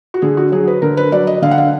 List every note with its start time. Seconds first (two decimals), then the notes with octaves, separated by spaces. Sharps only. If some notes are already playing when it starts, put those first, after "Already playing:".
0.14 F#4
0.22 D3 G#4
0.37 F#4
0.52 F#3 G#4
0.67 B4
0.82 D3 A#4
0.97 B4
1.12 F#3 D5
1.27 D#5
1.42 D3 F5
1.51 F#5
1.58 F5